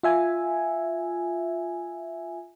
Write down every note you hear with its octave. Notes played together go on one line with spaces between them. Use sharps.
F4 E5 G#5